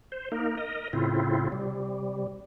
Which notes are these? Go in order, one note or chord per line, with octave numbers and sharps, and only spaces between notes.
C5
A#3 D#4 A#4
A#4 D#5
A2 C#3 C4 E4 F4
C3 G3